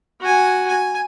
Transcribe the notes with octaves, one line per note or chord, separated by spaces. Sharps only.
F#4 G#5
G#5